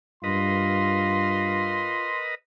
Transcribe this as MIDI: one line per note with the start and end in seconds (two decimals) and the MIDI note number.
0.24 1.96 43
0.24 2.09 65
0.24 2.35 70
0.24 2.35 71
0.24 2.35 75
0.24 2.20 84